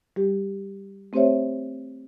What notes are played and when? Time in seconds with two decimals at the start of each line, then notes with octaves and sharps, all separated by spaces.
0.16 G3 G4
1.13 A3 C4 G4 C5 C#5 E5